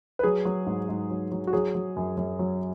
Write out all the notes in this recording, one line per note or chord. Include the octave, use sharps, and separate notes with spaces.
B4
F#3 G#4
F#3
G#2
G#2
F#3
F#3
F#4
F#3 G#4
F#3
F#2
F#2
F#3